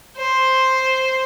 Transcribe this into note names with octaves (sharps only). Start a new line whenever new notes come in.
C5